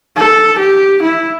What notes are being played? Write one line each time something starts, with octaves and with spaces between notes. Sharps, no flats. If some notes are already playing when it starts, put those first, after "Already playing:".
A4
G4
E4